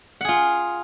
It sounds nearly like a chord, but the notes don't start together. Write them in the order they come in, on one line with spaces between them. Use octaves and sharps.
F#5 G#4 F4